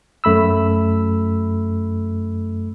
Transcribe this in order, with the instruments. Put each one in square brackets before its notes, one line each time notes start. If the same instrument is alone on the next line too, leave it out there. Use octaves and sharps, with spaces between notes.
[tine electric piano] F#2 A3 B5 E6